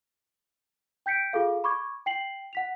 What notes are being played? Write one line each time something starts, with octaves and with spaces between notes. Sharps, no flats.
G5 G6 B6 C#7 D7
F4 G#4 A4 F5
B5 C#6 D6 G#6
G5 C7 F#7
F#5 B6 F7